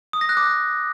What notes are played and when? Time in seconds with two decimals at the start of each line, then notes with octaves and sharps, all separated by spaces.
0.13 D#6
0.21 A#6
0.29 F#6
0.37 D6